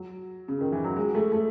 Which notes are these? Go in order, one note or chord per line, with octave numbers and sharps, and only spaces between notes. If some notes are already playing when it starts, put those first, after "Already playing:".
Already playing: F#3
C#3
D#3
E3
F#3
G#3
A3
A3